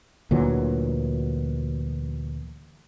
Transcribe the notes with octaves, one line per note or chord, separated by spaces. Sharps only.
D2 A#2 E3 F#3